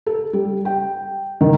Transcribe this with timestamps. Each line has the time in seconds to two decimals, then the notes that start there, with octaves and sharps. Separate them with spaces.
0.06 A4
0.33 G3
0.65 G5
1.41 D#3